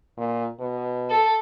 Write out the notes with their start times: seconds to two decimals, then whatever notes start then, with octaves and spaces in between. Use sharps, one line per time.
0.17 A#2
0.60 B2
1.10 A4